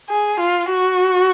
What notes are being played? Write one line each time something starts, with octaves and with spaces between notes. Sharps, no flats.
G#4
F4
F#4